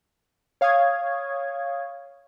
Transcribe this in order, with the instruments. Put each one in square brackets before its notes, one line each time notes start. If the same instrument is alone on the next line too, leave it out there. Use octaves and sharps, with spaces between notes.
[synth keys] C#5 F5 C#6 D#6 G#6